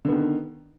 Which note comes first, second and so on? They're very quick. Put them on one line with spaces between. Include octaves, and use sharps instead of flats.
D3 B3 D#3